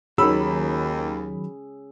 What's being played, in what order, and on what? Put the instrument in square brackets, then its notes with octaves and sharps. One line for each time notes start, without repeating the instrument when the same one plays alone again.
[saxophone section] D#2 [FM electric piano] D#3 F#3 [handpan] C#4 G#4 [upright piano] B5 E6